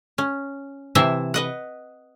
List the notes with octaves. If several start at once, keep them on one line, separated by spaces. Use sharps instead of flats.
C#4
C3 E3 E4 C5 E5 A5
B4 D#5 F#5